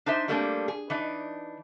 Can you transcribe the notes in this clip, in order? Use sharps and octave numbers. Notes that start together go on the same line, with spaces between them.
D4 D#4 C5 E5
G3 A3 A#3 C4 D4 G#4
G#4
E3 D4 D#4